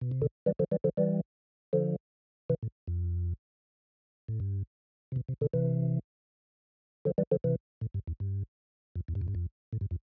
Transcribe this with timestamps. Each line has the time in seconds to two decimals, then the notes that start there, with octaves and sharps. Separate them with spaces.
0.01 B2
0.12 C3
0.22 B2 D3
0.46 E3 G3
0.59 D3 F3
0.72 E3 G3
0.84 D3 F3
0.97 E3 G3
1.73 D3 F3
2.50 C3 E3
2.63 A2
2.88 F2
4.28 A2
4.40 G2
5.12 C3
5.16 B2
5.29 C3
5.41 B2 D3
5.54 C3 E3
7.05 D3 F3
7.18 E3 G3
7.32 D3 F3
7.44 C3 E3
7.81 A2
7.94 G2
8.08 E2
8.20 G2
8.96 F2
9.08 E2
9.15 G2
9.21 F2
9.28 G2
9.35 F2
9.73 A2
9.81 G2
9.91 F2